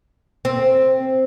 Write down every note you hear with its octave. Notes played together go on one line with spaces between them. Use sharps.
C4